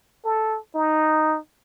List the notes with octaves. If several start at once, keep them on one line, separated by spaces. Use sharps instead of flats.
A4
D#4